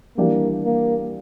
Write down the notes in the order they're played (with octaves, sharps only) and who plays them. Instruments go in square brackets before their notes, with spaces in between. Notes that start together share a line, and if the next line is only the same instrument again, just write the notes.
[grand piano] E3 G3 D4 G4 D5 [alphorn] A#3
[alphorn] A#3